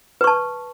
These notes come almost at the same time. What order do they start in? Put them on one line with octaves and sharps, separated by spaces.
B4 C#6 A5